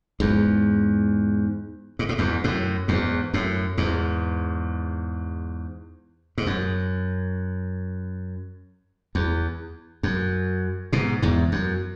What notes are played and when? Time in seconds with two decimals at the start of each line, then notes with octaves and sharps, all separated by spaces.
0.20 E2 G#2
1.99 G#2
2.09 A2
2.18 E2 G#2
2.44 F#2 A2
2.88 E2 G#2
3.34 F#2 A2
3.78 E2 G#2
6.38 G#2
6.47 F#2
9.15 E2
10.03 F#2
10.93 G#2 B2
11.22 E2 G#2
11.52 F#2